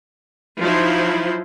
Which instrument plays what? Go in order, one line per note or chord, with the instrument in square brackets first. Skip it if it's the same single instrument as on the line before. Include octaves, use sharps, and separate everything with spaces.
[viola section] F3 F#3 D#4 E4 C5